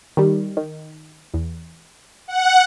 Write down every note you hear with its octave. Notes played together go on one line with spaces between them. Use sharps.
D#3 G3
D#3
E2
F#5